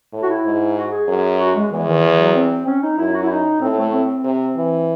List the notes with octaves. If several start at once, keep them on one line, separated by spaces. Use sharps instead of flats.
A2
F#4
E4
G#2
F#4
G#4
F#2
F#4
G#3
E2 E3
D#3
E3
F#3
C4
C#4
D#4
F#2 E4
F#4
E4
D#4
A2 C4
A3
C4
C3
E3